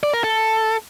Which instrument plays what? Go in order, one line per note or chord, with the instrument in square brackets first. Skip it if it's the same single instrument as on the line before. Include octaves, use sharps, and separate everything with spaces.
[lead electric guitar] D5
A#4
A4